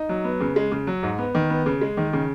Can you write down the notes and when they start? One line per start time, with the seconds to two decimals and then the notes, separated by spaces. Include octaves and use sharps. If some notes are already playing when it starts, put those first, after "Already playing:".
Already playing: D#4
0.09 F#3
0.24 B3
0.40 C#3
0.56 G#3
0.72 C#3
0.87 F#3
1.03 G#2
1.18 B3
1.35 D#3
1.50 B3
1.66 C#3
1.81 G#3
1.97 D#3
2.13 C#3